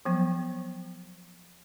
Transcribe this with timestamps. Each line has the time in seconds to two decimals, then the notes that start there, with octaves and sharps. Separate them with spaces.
0.05 F3 F#3 B3